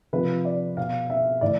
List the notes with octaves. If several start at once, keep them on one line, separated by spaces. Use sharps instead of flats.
C3 F3 B4
D5
B2 F5
E5
A2 E3 D5